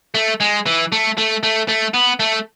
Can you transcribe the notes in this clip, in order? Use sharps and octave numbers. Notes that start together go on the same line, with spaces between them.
A3
G#3
E3
A3
A3
A3
A3
B3
A3